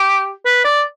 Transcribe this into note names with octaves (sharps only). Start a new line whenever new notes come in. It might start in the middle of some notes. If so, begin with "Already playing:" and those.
Already playing: G4
B4
D5